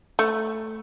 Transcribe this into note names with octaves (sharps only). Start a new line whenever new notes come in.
A3